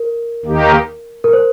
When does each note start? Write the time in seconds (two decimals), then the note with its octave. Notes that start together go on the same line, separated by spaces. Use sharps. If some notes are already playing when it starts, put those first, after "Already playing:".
Already playing: A#4
0.45 D#2 D#3 A#3 D#4 G4
1.24 A#4
1.33 C5